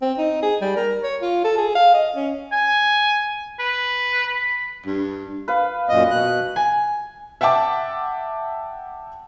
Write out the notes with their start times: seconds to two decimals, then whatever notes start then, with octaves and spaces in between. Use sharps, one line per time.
0.02 C4
0.18 D#4
0.42 G#4
0.61 G3
0.76 A#4
1.03 C#5
1.22 F4
1.44 A4
1.58 G#4
1.75 F5
1.94 D#5
2.16 C#4
2.52 G#5
3.59 B4
4.27 B5
4.86 G2
5.48 B4 F5
5.89 F#2 A#2 D#5
6.10 B2 F#6
6.56 G#5
7.41 E5 F#5 G5 A5 D6